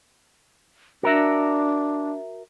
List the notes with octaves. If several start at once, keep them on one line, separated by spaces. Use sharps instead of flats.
D4 F#4 A#4 E5